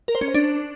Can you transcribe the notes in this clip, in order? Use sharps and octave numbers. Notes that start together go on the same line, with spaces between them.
A#4
C5
C#4
C5
D4